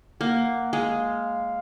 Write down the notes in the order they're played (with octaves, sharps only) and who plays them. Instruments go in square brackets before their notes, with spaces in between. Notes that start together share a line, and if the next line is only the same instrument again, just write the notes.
[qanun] A#3 [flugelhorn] F#5
[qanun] G#3 [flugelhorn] F5